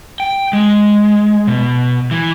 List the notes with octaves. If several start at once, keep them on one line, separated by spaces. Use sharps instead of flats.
G5
G#3
B2
E3